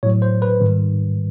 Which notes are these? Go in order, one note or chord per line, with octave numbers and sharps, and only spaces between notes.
A2 F#3 C#5
C5
B4
G#2 D#3 G3